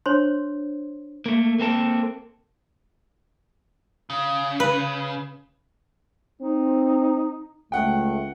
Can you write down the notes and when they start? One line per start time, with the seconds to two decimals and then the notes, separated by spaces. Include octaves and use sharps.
0.06 D4 C5 C#5 C6
1.26 A3 A#3
1.60 A#3 C4 A4 A#4
4.10 C#3
4.60 B4
6.41 C4 D#4
7.72 C#2 A3 F#5 G5